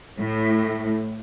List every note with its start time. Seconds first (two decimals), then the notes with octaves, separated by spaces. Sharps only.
0.19 A2